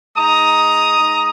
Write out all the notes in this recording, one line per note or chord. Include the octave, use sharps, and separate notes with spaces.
G#3 D#4 A#5 D#6
G#3 D#4